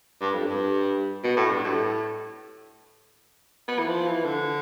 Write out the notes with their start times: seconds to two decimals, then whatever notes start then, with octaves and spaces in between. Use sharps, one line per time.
0.21 G2
0.34 F2
0.46 G2
1.24 B2
1.37 A2
1.51 G2
1.64 A2
3.68 B3
3.79 E3
3.88 F3
4.07 E3
4.25 D3